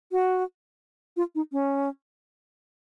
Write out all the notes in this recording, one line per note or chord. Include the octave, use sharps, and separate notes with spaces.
F#4
F4
D#4
C#4